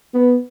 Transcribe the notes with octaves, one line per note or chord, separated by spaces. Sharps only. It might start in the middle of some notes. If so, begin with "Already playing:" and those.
B3